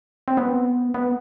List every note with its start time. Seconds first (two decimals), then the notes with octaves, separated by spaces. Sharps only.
0.28 C4
0.37 B3
0.94 B3